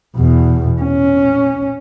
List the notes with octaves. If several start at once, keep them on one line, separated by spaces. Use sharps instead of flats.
E2 B2
C#4